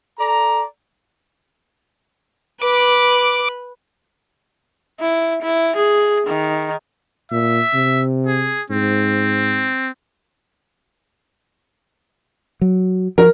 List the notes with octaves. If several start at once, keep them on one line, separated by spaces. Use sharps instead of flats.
A4 D5 A#5
B4 D6
E4
E4
G#4
D#3
A#2 E5
C3
G#4
G#2 C4
F#3
F3 A#4